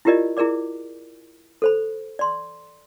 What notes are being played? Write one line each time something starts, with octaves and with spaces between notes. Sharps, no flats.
E4 F4 G4 A#4 D5 D#5
E4 G#4 A#4 D5 D6
A4 C5 B5
D5 C6